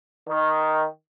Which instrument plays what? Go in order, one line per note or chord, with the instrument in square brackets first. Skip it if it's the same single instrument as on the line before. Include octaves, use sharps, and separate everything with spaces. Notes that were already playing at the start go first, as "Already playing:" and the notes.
[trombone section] D#3